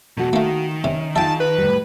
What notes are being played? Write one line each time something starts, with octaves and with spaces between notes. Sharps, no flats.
E2 B2 F#4 A4
D#3 A3 A#3
C3 C#4
D#4 F4 G#4 E5 G5 A5
B4
A2 G3